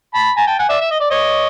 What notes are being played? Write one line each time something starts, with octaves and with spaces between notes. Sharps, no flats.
A5 B5
G#5 A#5
G5 A5
F#5 G#5
D5 E5
E5
D#5
D5
C#5 D#5